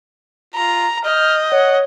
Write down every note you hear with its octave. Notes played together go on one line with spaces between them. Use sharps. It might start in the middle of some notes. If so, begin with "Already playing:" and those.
F4 A#5
D#5 F6 G6
C#5 F#5